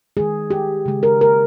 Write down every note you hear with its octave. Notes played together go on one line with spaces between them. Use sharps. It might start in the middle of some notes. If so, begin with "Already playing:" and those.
D#3 G#3 G#4
G4
C#3 G#3
A#4
A#4